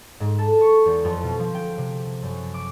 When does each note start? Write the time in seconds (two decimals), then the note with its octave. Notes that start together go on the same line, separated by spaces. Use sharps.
0.20 G#2
0.38 A4
0.61 C#6
0.85 E2
1.05 F2
1.23 B2
1.40 F3
1.55 G5
1.78 C3
2.22 F#2
2.54 D6